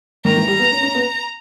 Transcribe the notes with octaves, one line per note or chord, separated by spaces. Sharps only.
D#3 A#5
E3
G3
B3
C#4
C#4
B3